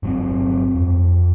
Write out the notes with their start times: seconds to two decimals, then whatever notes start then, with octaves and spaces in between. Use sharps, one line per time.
0.03 G1 F#3 C4
0.76 F2